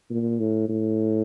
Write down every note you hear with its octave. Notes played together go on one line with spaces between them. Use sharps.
A#2
A2
A2